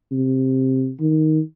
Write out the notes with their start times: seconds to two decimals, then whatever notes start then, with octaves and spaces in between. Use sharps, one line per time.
0.11 C3
1.00 D#3